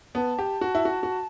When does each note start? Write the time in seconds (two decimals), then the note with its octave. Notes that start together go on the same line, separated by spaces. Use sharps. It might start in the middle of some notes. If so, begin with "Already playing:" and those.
0.15 B3 A5
0.39 G4
0.61 F#4
0.75 E4
0.85 F#4
1.03 F#4